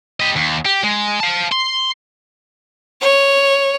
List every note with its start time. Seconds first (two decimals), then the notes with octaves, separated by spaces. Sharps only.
0.20 G4 D#5
0.36 D#2
0.66 G4
0.84 G#3
1.20 F5 A5
1.52 C6
3.01 C#5